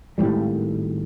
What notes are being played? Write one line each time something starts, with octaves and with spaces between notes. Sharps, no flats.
G#1 D#2 A2 G3